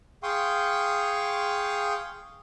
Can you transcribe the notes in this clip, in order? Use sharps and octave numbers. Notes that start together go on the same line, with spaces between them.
G#4 F5 G5 C6 C#6 D#6